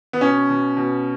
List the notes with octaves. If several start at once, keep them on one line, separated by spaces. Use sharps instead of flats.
B3
B2 C#4
B2
B2